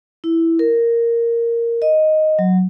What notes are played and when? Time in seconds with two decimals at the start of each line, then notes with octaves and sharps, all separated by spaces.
0.24 E4
0.59 A#4
1.82 D#5
2.39 F#3